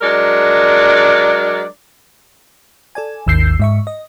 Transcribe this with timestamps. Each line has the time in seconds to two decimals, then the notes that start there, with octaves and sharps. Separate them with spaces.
0.02 F#3 G#3 D4 A#4 D5
2.95 A4 D5 G#5
3.27 G#1 D#2 E6 G6 C7
3.59 G#2 E5 C#6
3.87 D#5